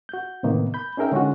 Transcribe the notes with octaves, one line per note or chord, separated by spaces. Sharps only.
F#4 G6
A2 C3 D#3 A#3 B3
B5 G6
C#4 D#4 G#4 A#4 E5 G5
D3 G#3 C#4 D#4 F4 F#4